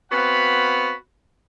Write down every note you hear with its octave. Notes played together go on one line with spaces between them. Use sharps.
B3 C4 F#4 F5 B5